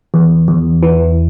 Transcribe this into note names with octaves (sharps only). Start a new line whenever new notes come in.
E2
E2
E3